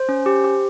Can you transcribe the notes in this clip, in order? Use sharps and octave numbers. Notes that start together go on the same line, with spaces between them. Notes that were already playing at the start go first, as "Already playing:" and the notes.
Already playing: C5
C#4
G4
G4